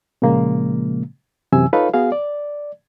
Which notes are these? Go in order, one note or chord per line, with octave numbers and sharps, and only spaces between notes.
A#2 C#3 F3 G#3 A#3
F#2 C3 E3 G#5 E6
D#4 F4 A4 B4 C#5 F5
B3 F#4 G#4 F5
D5